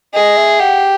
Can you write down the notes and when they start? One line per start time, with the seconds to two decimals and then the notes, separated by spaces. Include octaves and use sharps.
0.14 G#4 D#5
0.37 E5
0.60 G4 F#5